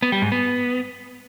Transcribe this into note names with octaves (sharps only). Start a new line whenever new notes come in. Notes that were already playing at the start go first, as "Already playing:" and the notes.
B3
G3
G#2
B3